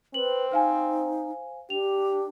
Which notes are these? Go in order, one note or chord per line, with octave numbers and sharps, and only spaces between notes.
C4 B4 F#7
D#4 C5 F5 G#5
D4 G4 F7